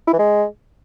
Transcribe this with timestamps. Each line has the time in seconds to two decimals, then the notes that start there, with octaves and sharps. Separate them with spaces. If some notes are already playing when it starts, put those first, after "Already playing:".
0.08 E4
0.13 E3
0.19 G#3